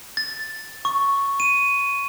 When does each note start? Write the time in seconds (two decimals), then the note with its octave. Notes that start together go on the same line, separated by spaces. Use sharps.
0.17 A6
0.85 C#6
1.40 D#7